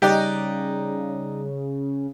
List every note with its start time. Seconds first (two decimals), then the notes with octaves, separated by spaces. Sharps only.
0.02 C#3 G3 D#4 G4 D5 F#6